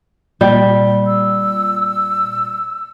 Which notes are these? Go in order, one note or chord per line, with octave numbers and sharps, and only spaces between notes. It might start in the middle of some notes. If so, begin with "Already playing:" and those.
A#2 G3
E6